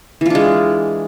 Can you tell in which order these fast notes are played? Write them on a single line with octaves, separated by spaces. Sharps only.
E3 F4 D4 G#3